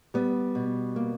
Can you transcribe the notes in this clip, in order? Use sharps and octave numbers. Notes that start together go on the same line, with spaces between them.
G3 B3
B2
A#3